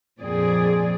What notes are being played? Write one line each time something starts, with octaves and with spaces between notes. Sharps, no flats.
F2 A#2 C4 G#4 D5